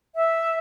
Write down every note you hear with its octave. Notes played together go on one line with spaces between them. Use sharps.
E5